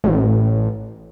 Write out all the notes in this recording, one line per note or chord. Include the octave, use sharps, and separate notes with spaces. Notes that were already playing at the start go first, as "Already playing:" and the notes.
A1